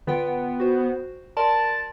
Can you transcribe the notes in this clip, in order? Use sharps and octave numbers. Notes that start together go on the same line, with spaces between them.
D3 B3 F4 G5
F#4 C5
A#4 D5 A5 C6